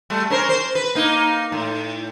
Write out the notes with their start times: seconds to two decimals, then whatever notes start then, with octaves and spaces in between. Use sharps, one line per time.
0.10 G3 A3
0.30 C#4 A#4 C5
0.49 C5
0.75 B4
0.95 A#3 D#4
1.52 A2